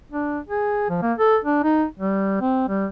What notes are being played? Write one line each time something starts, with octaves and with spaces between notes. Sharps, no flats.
D4
G#4
F3
A#3
A4
D4
D#4
G3
C4
G3